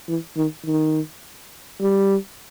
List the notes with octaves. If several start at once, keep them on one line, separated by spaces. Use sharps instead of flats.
E3
D#3
D#3
G3